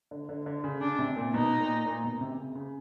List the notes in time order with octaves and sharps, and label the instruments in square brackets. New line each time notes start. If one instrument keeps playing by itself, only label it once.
[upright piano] D3
D3
D3
C#3
[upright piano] C#3 [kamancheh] D4
[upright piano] C3
A#2
[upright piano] B2 [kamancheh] D#4
[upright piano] A#2
A#2
B2
C3
C#3
C#3